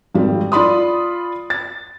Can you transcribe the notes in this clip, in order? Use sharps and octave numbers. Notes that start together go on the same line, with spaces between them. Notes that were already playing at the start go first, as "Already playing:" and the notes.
G#1 F2 G3
F4 D5 B5 C6 D#6
A6